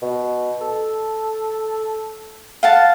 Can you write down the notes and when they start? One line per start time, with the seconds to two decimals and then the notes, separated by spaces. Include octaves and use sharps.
0.02 B2
0.61 A4
2.63 F5 F#5 A5